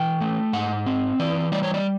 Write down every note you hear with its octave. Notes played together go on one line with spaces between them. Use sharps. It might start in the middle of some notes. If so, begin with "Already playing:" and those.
Already playing: E3 G5
A3
G#2 F#5
C4
E3 D5
G3 D5
C#5
D5